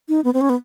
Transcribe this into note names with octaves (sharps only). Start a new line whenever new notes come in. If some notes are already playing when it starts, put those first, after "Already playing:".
D#4
B3
C4
C#4
B3